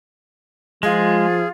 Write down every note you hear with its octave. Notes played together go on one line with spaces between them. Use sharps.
F3 G#3 F4 G#4